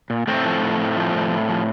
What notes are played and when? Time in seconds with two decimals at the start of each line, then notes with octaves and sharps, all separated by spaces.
0.10 A#2
0.27 A2 A3 C4
0.45 F3
0.62 A2
0.80 A2
0.97 F3
1.14 A2
1.32 A2
1.49 F3